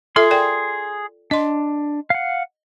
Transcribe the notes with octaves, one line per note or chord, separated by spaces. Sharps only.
F4 G#4 A4 E5 C6
A#4 D5 G5
D4 D#5 C6
F5 F#5